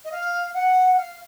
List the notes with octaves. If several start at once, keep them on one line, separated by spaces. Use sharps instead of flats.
D#5
F5
F#5
F5